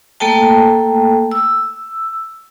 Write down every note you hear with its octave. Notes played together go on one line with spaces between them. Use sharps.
A3 A#3 A4 G5 A5
E6